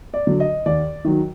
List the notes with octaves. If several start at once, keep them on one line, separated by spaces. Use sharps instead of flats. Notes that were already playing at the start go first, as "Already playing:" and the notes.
D5
D3 F#3
D#5
D#2 D5
D#3 F#3